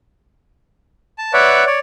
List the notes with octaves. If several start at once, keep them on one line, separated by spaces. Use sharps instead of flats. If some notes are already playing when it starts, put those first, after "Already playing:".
A5
B4 C#5 D5 E5 F#5
C#5 D5